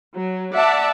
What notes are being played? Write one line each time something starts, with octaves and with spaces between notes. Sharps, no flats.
F#3
D5 E5 F#5 A5